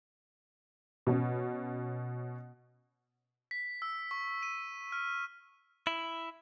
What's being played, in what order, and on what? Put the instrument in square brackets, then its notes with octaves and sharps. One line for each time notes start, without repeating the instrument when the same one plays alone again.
[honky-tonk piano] B2 C#4
[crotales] B6
E6
C#6
D#7
F6
[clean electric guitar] E4